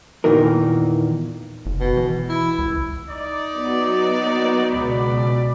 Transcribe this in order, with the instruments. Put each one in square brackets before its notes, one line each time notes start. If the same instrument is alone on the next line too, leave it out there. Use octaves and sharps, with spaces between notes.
[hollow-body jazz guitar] E2 A#2 D#3 E3 D#4 A#4
[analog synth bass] F#1
[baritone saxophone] B2
[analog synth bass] E3
[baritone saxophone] E4
[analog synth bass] C#2
[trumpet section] D#4 D5
[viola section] F#3 B3
[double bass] C#2 B2 [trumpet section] D5 B5